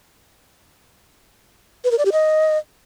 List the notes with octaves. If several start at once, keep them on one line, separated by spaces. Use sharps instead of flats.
B4
A#4
D5
G4
D#5